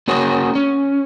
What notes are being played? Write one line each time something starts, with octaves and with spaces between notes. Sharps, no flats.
A#3 C#4 F#4 G#4 A#4 C#5
C#4